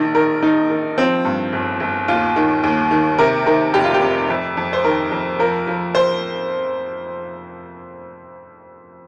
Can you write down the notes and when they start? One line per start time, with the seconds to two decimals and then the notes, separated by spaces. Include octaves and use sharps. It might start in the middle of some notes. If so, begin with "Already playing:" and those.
Already playing: A#1 D#3
0.15 D#3 A#4
0.42 D#3 D#4
0.70 D#3
0.98 F3 C4
1.25 G2
1.53 G1
1.80 G1
2.08 D#2 F4
2.36 D#3
2.64 D#2
2.91 D#3
3.19 C3 A#4
3.46 D#3 A#4
3.74 F1 G4
3.84 F4
3.94 G4
4.02 C3
4.30 F2
4.57 F2
4.73 C5
4.84 D#3 A#4
5.11 F2
5.39 F3 A#4
5.67 F3
5.95 C5